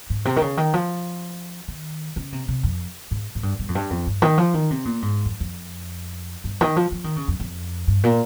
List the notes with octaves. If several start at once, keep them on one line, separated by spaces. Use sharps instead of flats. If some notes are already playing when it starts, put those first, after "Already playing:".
G#2
C3
D#3
C#3
D#3
F3
D#3
C#3
C3
C3
F2
G#2
G#2
G2
G2
F2
G2
F2
G2
D#3
F3
D#3
C3
A#2
G#2
F2
F2
G2
D#3
F3
F3
D#3
C#3
F2
F2
G2
A#2